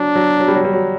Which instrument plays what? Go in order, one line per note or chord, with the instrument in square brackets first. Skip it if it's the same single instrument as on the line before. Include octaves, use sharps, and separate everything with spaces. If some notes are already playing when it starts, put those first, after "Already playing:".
Already playing: [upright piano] F#3 [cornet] D4
[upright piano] F#3
F#3
G3
F#3
G3
F#3